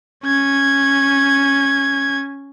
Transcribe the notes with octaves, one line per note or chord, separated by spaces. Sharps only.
C#4 G#6